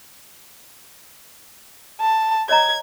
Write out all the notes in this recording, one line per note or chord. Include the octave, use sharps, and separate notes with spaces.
A5
C#5 D#5 A#5 G#6